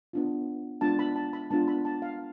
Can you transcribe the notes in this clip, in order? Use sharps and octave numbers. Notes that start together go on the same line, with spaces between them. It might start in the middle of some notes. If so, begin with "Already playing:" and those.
B3 D4 F4
G#3 B3 D4 F4 A5
B5
A5
B5
G#3 B3 D4 F4 A5
B5
A5
F5